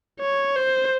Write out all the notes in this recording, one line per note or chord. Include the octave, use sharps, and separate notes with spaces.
C#5
C5